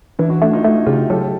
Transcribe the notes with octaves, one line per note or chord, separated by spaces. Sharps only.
E3 D4 E4
E4 F#4
A3 D4 E4
D#4 F4
A3 E4 F#4
C#3 F4 G4
F#3 G4 A4